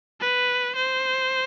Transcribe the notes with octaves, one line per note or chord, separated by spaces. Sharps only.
B4
C5